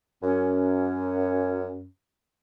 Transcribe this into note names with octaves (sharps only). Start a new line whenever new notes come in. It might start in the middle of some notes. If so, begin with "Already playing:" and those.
F#2 C#4